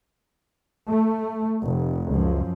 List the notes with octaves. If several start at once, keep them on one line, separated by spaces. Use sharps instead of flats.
A3
F1
C#2 F#2 F3